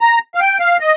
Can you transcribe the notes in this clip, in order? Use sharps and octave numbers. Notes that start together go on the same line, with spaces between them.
A#5
F5
G5
F5
D#5